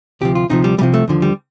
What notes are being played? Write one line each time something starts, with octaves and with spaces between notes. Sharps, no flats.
D2 C3 F3 G4
F4
D2 C3 F3 D#4
G3
C2 C3 F3 G3
A3
D#2 D3 F3
G3